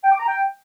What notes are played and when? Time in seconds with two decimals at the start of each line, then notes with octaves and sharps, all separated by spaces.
0.04 G5
0.12 D6
0.20 A#5
0.27 G5